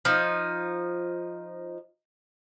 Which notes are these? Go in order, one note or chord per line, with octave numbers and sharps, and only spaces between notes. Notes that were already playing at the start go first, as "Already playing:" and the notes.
F3 D#4